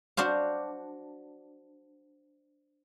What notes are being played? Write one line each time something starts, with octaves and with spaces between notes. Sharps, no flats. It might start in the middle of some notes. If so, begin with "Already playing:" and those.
D4 F#4 C5 F5